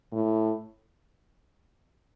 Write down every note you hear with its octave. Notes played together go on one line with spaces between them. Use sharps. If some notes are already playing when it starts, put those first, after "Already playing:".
A2